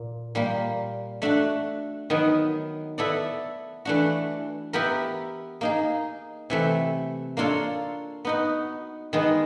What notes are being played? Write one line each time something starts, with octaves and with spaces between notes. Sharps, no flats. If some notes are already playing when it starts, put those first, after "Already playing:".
Already playing: A#2
A#2 G3 A#3
A3 D4 F#4
D#3 F#3 B3
B3 E4 A4 D5
E3 A3 D4 F#4
B3 E4 G4 A#4
A#3 D#4 G#4
C3 E3 A3
A#3 D4 F4 A4 C#5
B3 D#4 F#4
D#3 G#3 B3